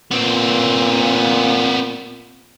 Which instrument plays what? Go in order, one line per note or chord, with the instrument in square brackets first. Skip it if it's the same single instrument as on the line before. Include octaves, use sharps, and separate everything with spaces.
[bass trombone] A#2 [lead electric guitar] B3 C4